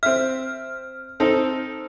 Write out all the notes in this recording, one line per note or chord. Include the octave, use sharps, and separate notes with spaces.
C4 E5 F6
C4 D#4 A4